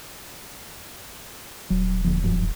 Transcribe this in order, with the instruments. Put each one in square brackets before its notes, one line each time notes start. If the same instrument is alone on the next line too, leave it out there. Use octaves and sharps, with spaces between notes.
[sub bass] D#1 [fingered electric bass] F#3
[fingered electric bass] D#2 D3 F3
G1 F#2 F3